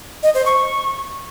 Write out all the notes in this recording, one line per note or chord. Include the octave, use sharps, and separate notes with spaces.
D#5
C5
C#6